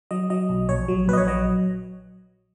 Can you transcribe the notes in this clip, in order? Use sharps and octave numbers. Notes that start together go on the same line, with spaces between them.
F#3 D#5
F#3 D#5
B1
A#1 C#5
F#3
A#1 B4
D#5
C#5
F#3 D#5